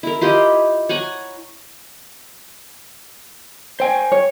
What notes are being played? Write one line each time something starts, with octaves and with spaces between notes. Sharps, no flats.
E4 A#4
E4 F4 G4 D#5
C#5 F#5 G#5 A#5
C5 G5 G#5
C#5